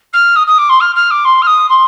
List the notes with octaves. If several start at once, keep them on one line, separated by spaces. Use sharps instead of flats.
F6
D#6
D#6
D6
C6
F6
F6
D6
C6
F6
D#6
C6